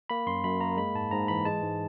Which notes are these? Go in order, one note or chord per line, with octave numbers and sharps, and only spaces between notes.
A#3 B5
F#2 C6
F#2 B5
A#3 A#5
G#3 B5
G#2 A5
G#2 A#5
E3 B5
G#3 A5
G#2